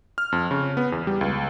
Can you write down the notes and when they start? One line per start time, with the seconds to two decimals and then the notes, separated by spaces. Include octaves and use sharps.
0.18 F6
0.32 F2
0.51 C#3
0.77 B3
0.92 E2
1.07 G3
1.21 C#2